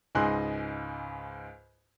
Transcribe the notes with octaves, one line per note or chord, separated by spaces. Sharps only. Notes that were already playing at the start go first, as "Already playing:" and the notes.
C#2 G#2 D#5 G#5 C6 F#6